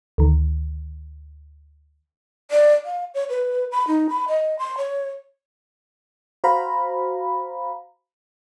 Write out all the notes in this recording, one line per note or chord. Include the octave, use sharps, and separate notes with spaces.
D2 D#3
D5
F5
C#5
B4
B5
D#4
B5
D#5
C6
C#5
F#4 C5 F5 A#5 B5